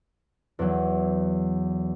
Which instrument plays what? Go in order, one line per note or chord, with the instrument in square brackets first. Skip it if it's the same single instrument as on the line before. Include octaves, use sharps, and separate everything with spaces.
[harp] E2 F#3